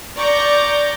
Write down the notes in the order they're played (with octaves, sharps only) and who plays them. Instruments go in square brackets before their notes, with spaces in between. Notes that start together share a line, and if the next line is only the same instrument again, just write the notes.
[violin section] D5 A#5 C#6 D6 G6 A#6